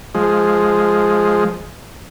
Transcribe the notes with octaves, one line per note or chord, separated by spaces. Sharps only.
F3 G#3